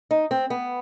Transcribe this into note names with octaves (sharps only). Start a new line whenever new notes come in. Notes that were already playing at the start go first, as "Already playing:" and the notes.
D#4
C4
B3